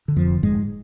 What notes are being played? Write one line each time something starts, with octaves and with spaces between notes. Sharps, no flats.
D3
F2 F3
F1
F1 G#2 G#3